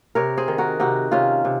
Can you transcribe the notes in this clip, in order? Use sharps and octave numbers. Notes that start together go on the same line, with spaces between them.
C3 A#4 C#5
G#4 C5
D#3
F#4 A#4
C3 D#4 F#4
C3 C#4 F4
C3